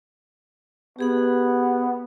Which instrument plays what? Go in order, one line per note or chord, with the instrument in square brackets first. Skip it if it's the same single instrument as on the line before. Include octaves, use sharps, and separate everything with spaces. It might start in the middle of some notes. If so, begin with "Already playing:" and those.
[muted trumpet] B3 [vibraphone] G4 G#4 F#5